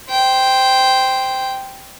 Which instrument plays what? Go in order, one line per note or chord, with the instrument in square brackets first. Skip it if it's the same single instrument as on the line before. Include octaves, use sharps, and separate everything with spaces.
[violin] C5 G5